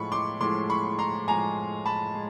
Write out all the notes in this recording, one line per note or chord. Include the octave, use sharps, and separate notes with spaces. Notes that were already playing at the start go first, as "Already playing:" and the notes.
Already playing: A2 F3 G#3 B5 C#6
C6 D6
A2 F3 G#3 C6 D6
B5 C#6
A#5 C6
A2 F3 G#3 G#5 A#5
A5 B5
G#3